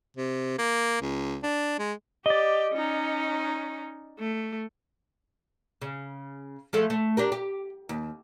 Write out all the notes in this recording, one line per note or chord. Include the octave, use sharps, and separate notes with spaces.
C3
A#3
C#2
D4
G#3
G4 D5 D#5
C#4 D#4
A3
C#3
F3 G#3 A3
A3
D4 G4 A#4
G4
D#2